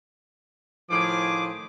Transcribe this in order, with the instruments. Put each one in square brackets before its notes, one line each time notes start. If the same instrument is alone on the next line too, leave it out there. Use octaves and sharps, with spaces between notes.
[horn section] A2 D#3 F3 [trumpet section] G#4 D6